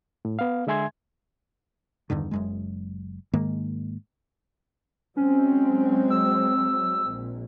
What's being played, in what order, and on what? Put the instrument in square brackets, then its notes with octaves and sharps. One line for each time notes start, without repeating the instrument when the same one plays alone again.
[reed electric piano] A2
B3 F5
D3 G#3 E5 G#5 C6 G#6
[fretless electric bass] E2 G2 D3 D#3
F#1 F#2 G#3
G#2 D#3 G#3 A#3
[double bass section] F#3 G#3 C4 [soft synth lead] C#4
[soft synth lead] E6
[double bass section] A#1